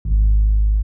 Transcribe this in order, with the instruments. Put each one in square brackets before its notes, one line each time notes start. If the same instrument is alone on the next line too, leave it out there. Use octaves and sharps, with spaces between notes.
[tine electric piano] G#1